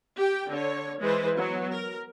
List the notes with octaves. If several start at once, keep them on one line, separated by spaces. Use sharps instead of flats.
G4 G5
D3 C#5
E3 G#3 B4 C5
F#3 B3
A#4